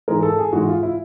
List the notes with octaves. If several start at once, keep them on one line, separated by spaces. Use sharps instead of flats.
G#2 E3 G#3 A#4
A4
G#4
G#2 E3 G#3 F#4
F4
E4